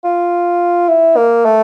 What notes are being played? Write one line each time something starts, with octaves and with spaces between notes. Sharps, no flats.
F4
E4
A#3
A3